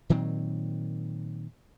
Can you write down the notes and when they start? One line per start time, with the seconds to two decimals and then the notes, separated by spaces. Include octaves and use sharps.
0.10 A#2 D#3 F#3 C4